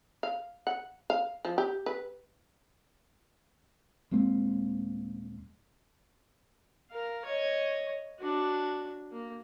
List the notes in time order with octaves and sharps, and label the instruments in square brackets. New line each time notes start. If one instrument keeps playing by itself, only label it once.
[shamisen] F5
F#5
F5
F3
G4
B4
[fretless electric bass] D#1 G#3 A#3 C4
[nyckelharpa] A#4 F5
C#5 D#5
D4 F#4
A#3